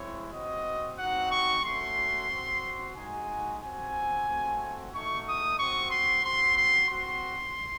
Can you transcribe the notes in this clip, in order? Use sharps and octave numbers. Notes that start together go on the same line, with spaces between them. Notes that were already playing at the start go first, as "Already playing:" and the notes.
Already playing: G#3 C4 E4 C#5
C4 F#4 D#5
C4 D#4 F#4 F#5
C#6
A3 C#4 F#4 C6
C4 F#4
G#3 D#4 F#4 G#5
C4 F#4 G#5
A3 C4 F#4
A3 D#4 F#4 C#6
D#6
C4 F#4 C#6
C6
C4 F#4 C6
C6
C4 F#4 C6